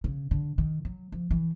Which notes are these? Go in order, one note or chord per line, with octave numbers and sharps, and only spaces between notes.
C#3
D3
D#3
F#3
F3
E3